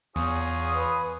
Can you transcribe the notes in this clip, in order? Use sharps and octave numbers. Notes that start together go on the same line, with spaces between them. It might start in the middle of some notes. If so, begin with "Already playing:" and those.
E2 F4 G#4 C#5 D#6
B4